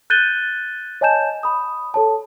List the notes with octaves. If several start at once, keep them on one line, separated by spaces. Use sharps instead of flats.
F#6 G6 A6 D#7 G7
C#5 D#5 G#5 A5 G6 E7
B5 D#6
A4 C#5 A5